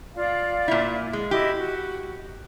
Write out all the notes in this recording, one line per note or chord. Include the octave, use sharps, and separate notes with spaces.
F4 D5 F5
A#2 E4
G#3
E4 F#4 G4 D#5
F#4